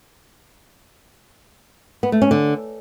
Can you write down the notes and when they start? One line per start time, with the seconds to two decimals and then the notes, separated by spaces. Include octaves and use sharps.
2.03 B3
2.12 A3
2.22 C#4
2.31 D3